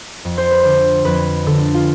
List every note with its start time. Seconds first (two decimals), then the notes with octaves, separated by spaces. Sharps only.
0.25 F2
0.38 C5
0.51 B4
0.63 D3 C5
1.05 F2 B4
1.46 D3 A4
1.74 F4